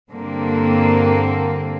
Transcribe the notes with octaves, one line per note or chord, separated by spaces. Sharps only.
G2 D3 A#3 C4